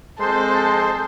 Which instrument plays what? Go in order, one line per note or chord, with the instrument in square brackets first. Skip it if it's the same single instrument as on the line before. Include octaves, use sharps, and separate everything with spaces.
[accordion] F2 C5 C6 [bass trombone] G#3 [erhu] A4